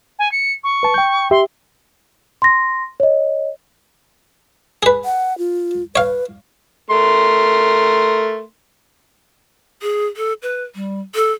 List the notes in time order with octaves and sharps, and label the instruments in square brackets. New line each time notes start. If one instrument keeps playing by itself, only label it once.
[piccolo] G#5
C#7
C#6
[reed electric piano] B4 A5
G5 G6
[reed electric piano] G4 E5 [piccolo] C6
[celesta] C6 A#6
C#5 D#5
[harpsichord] G#4 B4
[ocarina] F#5
F4
[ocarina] B4 [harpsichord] C#5 F5
[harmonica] A3 A#4 C6
[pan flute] G#4
A4
B4
G3
A4